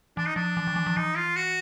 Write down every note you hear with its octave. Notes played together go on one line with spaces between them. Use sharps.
E3 D4
D#4
F3 D4
E3
D#3
E3
F3
E3 D#4
F4
F#4